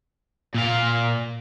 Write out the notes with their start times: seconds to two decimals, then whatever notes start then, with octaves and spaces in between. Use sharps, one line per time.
0.55 A#2 F5